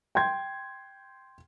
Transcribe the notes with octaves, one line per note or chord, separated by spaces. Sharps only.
G5 C6 G6 G#6